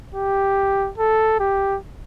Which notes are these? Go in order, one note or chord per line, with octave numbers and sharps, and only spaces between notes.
G4
A4
G4